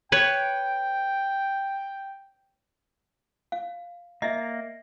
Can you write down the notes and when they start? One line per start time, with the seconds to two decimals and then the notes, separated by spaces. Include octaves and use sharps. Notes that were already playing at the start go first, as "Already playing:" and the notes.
0.12 B4 C#5 G5 C#6
3.52 F5
4.22 A#3 D#5 E5